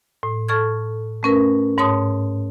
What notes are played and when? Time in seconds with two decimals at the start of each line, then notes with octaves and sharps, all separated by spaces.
0.23 A2
0.49 A4 A5 C#6 F6 G#6
1.23 A3 C#4 A#4 B4
1.78 G#2 C#5 A5 C6 D#6